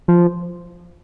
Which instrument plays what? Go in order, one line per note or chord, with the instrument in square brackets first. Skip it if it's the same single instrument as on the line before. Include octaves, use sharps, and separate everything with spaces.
[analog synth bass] F3